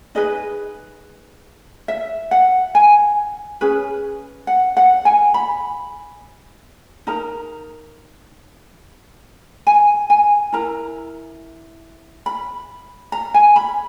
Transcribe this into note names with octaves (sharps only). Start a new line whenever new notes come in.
D#4 G#4 B4 D#5
E5
F#5
G#5
C#4 G#4 B4
F#5
F#5
G#5
B5
D#4 A#4 A#5
G#5
G#5
E4 A#4 A#5
B5
A#5
G#5
B5